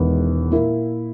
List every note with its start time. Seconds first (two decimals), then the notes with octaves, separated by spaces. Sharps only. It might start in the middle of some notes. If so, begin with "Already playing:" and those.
Already playing: E1 E2 D#3 G#3 B3
0.51 A#2 A#3 E4 A#4